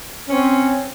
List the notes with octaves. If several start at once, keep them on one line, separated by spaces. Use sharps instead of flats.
C4 C#4